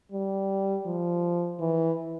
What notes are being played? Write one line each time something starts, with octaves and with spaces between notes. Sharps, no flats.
G3
F3
E3